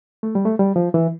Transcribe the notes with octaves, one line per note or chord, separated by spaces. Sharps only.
A3
G3
A3
G3
F3
E3